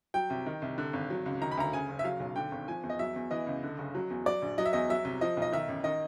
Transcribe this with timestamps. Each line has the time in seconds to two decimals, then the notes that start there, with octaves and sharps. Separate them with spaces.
0.14 F#3 G5
0.30 C2
0.46 D#3
0.62 C2
0.78 D3
0.93 G#1
1.10 F#3
1.26 C#2
1.41 D#3 A#5
1.51 B5
1.57 D2 A#5
1.73 C#3 G#5
1.89 F#1
1.99 E5
2.04 F#3 F5
2.20 B1
2.36 D3 G5
2.52 G#1
2.68 F3 G#5
2.83 E2
2.90 D#5
2.99 F#3 E5
3.16 E2
3.31 E3 D#5
3.47 C#2
3.63 D3
3.78 F#1
3.95 F#3
4.10 E2
4.26 F#3 D5
4.42 A#1
4.58 F#3 D#5
4.65 E5
4.73 E2 D#5
4.90 F#3 E5
5.05 C2
5.21 F3 D#5
5.37 B1
5.42 D#5
5.52 D#3 E5
5.68 A1
5.84 D#3 D#5